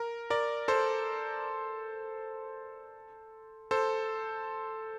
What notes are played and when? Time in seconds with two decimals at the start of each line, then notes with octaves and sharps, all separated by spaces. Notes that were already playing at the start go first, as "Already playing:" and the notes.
Already playing: A#4
0.30 A#4 D5
0.68 A4 C5
3.71 A4 C5